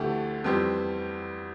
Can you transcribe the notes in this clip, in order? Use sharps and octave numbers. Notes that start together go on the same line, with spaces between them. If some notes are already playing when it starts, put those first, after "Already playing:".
Already playing: D2 D3 A3 E4 G4
F2 E3 G3 C4 G4